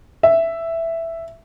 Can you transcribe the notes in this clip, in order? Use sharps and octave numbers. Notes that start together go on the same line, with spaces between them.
E5